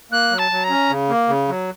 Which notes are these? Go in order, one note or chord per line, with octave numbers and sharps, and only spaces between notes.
A#3 F#6
F#3
A5
F#3
A#5
C#4
C#3
A#3
C#3
F#3